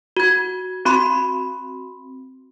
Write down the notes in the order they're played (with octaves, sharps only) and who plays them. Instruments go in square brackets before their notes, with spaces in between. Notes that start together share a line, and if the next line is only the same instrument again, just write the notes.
[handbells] F#4 G#6
C4 F#4 B5 C6